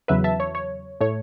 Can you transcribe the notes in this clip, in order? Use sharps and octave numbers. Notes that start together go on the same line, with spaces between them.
E2 C#3 F#3 B4 E5
E5 A5
C#5
C#5
A2 A3 C#5